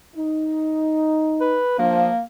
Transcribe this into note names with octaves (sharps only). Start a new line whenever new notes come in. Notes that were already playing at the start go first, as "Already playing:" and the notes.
D#4
B4
F3 A#3 D4